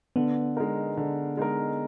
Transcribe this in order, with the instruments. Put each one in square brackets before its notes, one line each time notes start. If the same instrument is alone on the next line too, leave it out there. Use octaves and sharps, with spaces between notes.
[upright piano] D3 [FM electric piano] B3
[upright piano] G#3 D#4 A#4
D3
G#3 D#4 A#4